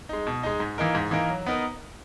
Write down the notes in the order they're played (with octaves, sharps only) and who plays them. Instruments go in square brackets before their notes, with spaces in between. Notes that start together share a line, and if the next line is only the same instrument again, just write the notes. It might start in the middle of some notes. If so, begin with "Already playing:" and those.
[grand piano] G#3 D#4
B2
G#3 D#4
G#2
E3 A#3 D#4 A#4
G#2
E3 A#3 D#4 A#4
F#3
B3 D#4 A#4